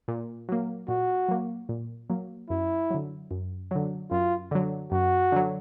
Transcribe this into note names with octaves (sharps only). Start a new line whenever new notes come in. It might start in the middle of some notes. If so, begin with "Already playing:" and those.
A#2
F#3 A#3
A#2 F#4
F#3 A#3
A#2
F#3 A#3
F#2 E4
D3 F#3
F#2
D3 F#3
F#2 F4
D3 F#3
F#2 F#4
D3 F#3